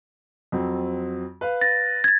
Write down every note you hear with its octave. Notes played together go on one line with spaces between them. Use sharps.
F2 F#3 C4
B4 F5
A6 A#6
G#6 A6